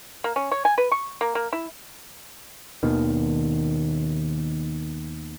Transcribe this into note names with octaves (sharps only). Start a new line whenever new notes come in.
A#3
C#4
C#5
G#5
B4
C#6
A#3
A#3
E4
D#2 B2 D#3